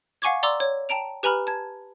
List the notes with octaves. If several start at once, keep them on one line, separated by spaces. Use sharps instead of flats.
F5 F#5 G#5 C#6 D6 G#6
D5 A#5 C6 D6 E6
C#5
G5 A5 A#5 D7 F7
G4 B4 G#5 A#5 B5 F6
A5 G#6